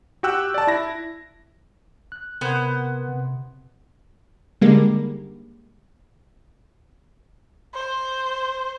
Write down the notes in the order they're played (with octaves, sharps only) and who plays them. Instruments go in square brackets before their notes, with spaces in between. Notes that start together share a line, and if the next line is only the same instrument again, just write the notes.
[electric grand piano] F#4 G4 G5 E6 F#6
D5 A5
E4 A#6
[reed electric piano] F#6
[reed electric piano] C3 A#4 G#6 [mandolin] B3 C5
[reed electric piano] C3
[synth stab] D3 D#3 G3 G#3 A#3
[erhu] C5